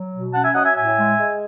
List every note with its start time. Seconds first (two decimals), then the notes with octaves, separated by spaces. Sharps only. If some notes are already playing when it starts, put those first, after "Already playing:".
Already playing: F#3
0.12 B2
0.34 C#4 F#5 A5
0.44 E5 G#5
0.54 F#3 D#5 F#5
0.65 E5 G#5
0.75 A2 E5 G#5
0.97 G#3
1.17 G#3